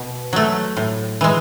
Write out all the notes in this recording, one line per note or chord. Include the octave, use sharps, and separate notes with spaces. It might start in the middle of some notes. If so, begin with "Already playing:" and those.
Already playing: B2
F#3 A3
A2
E3 G#3